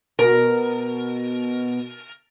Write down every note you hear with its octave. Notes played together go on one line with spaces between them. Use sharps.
B2 A#4